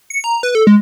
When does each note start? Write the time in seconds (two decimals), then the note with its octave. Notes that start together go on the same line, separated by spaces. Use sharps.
0.10 C#7
0.24 A#5
0.43 B4
0.55 A4
0.67 G#3